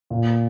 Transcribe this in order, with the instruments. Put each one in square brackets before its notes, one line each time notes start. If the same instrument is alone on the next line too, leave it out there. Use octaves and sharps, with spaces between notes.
[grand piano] A#2